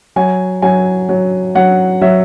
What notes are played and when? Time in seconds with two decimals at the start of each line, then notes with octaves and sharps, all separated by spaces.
0.16 F#3 G#5
0.62 F#3 G#5
1.09 F#3
1.55 F#3 F#5
2.01 F#3 E5